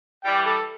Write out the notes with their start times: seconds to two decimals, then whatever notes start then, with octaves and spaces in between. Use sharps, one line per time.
0.25 E3 G3 G5
0.47 A4